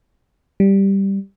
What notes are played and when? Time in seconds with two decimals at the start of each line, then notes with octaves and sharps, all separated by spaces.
0.60 G3